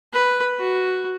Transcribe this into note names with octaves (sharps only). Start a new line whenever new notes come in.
B4
F#4